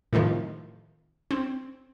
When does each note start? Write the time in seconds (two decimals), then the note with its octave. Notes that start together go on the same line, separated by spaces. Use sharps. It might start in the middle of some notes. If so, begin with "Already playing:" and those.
0.13 A2 C3 D#3 F3
1.31 C4